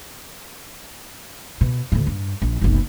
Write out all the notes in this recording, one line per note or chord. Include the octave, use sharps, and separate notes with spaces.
B2
D2 A2
G2
A#1
F#1 B1